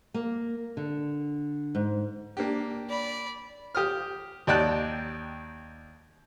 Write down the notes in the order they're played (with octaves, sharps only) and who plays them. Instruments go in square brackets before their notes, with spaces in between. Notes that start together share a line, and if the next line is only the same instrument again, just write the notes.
[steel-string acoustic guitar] A#3
D3
G#2
[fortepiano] A#3 D4 G4
[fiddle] D5 B5
[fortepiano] G4 D#6 F6
D#2 D#4 D5 G5 A5 F#6